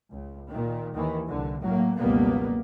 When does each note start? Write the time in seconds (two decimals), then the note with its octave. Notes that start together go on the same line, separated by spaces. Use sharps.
0.11 C#2
0.49 A#2 D#3
0.93 D#2 D#3 E3
1.27 C2 D3
1.61 A2 F#3 A#3
1.97 F#1 C#2 B2 G3 A#3 B3